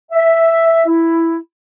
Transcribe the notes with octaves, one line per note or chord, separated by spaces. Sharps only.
E5
E4